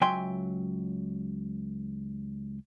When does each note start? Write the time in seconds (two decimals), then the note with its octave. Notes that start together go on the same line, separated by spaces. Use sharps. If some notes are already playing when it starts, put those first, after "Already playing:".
0.01 C#2 F#3 E5 G5 G#5 C6